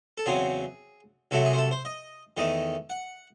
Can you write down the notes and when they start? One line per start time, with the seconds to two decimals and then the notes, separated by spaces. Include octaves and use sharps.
0.18 A4
0.26 E2 C#3 F#3 C4 G#4
1.31 C2 C3 F#3 A3 A4
1.45 G#4
1.53 C5
1.58 A4
1.71 C5
1.85 D#5
2.37 E2 D#3 A3 D#5
2.90 F#5